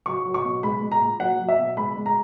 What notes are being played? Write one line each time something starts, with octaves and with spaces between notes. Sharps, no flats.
F#3 C#6
F#3
C#6
B2
G#3 B5
G#3
A#5
A#2
F#3 F#5
F#3
E5
B2
G#3 B5
G#3
A#5